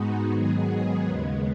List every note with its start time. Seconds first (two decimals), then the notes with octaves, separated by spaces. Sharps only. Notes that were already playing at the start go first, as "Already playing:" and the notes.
Already playing: G#2 G#3 B3 D#4 F#4
0.29 G#2 D#3 F#3 B3 G#4
0.68 G#4
1.06 D#2 C#3 G#3 B3